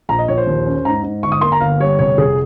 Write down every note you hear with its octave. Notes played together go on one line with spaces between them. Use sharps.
A#1 A#5
D#5
A#1 C#5
C5
D#2
C#4
G#2 A#5
G#2
G1 C#6
D#6
A#3 C6
A#5
G1 F5
G3 C#5
F1 C#5
F1 G#4